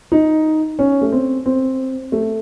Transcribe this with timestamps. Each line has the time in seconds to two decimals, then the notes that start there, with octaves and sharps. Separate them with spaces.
0.12 D#4
0.79 C#4
1.01 A3
1.12 C4
1.46 C4
2.12 A3